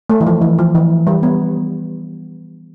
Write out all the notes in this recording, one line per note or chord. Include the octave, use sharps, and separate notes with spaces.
A3
E3
F3
E3
F3
E3
G3
B3